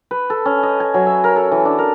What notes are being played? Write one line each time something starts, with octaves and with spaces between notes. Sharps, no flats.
B4
A4
C#4
D#5
G#5
F#3
E5
A#4
A4
E3
D4
A#4